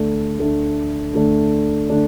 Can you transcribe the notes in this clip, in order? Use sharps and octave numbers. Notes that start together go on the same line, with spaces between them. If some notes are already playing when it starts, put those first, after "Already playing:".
Already playing: D2 D3 A3 D4
D2 D3 A3 D4
D2 D3 A3 D4
D3 A3 D4